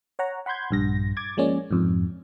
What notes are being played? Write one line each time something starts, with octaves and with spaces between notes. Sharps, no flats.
C#5 F#5 A#5
F#5 B5 C6 G6 G#6
A#1 G2 A#6
D6 G#6 A6
F3 G#3 A#3 C#4 D5
F2 G#2